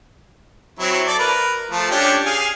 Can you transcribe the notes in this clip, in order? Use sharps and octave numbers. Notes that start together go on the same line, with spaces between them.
F#3 C4 E4
A4 D5
A#4 B4
F3 A3
C#4 D4 G4
G#4 F5 G#5